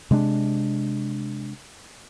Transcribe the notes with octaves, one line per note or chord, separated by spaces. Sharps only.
C3 G#3 C4 D4